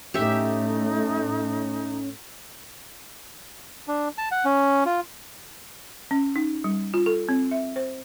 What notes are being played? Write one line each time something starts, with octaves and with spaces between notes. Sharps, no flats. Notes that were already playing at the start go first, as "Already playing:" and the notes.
A2 A3 C#4 D#4 G4 E5
D4
A5
F#5
C#4
F4
C#4
D#4
G3
F4
A4
C4
E5
C5